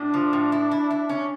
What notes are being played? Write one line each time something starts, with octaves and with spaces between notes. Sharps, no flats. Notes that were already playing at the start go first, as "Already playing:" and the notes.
Already playing: A2 D4
F3
A2
E4
E4
E4
C#4